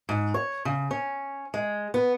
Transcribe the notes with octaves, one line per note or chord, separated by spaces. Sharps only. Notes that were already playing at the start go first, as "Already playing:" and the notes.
G#2
C#5
C#3
C#4
G#3
B3